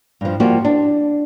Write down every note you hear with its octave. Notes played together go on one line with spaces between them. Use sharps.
G2 F3
F3 G3 A#3 F#4
D4